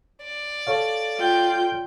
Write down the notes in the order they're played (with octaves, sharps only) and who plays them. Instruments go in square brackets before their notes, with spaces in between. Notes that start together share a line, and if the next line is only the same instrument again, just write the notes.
[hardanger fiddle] D5
[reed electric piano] A4 C#5 F5
[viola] F4 G5